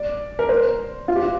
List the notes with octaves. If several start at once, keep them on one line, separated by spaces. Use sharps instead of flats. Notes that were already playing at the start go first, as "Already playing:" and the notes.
Already playing: D5
A#4
C5
F4
G4
F4